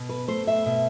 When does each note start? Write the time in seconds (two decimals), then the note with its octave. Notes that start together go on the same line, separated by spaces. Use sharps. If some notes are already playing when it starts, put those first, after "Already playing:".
Already playing: B2
0.09 B4
0.28 A3 C5
0.47 E5
0.66 B2